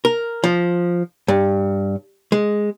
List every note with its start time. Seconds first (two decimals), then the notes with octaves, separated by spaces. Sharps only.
0.05 A#4
0.44 F3
1.28 G2
2.32 G#3